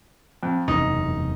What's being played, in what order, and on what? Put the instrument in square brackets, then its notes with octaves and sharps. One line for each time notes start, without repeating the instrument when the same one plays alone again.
[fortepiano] F2
[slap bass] E1 F#2 C3 [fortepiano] D#4